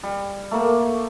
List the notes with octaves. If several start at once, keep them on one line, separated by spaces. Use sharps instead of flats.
G3
A3 A#3